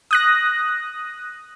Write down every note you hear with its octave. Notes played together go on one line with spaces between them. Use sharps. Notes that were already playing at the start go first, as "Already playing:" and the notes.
D#6 F#6 A#6